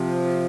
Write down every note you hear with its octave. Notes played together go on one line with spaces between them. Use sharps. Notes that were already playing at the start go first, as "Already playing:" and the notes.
Already playing: C3 F3